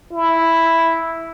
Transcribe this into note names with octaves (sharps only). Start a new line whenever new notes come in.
E4